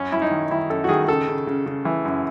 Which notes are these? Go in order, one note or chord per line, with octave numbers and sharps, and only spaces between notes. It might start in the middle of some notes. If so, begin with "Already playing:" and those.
Already playing: F#2 C#4
F#2 E4
D#4
D#3
D#3 E4
F#2 A4
F#4
D#3 G#4
C#3 A4
C#3
C#3
C#3
E3
F#2